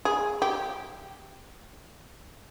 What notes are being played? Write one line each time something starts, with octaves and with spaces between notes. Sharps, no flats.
G#4
G4